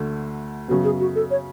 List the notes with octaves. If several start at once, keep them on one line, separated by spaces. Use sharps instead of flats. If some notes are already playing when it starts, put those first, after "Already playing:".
Already playing: D2 D3 A3
F#2 C#3 F#3 B3 F#4
G#4
F#4
A4
C#5